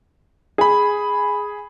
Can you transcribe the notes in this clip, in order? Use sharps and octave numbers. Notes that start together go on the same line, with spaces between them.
G#4 B5